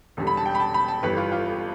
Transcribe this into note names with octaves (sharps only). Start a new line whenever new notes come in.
E1 E2 D3 G3
B5
A5
G5
B5
A5
B5
A5
G1 F2 E3 G3 B4
F4
F4